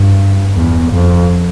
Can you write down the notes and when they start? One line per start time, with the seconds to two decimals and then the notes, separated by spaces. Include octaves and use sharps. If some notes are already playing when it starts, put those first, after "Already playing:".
Already playing: G2
0.56 E2
0.92 F2